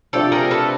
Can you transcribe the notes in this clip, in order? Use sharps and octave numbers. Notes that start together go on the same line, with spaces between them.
C3 F3 A3 D4 G4 A4
G#4 A#4
A4 B4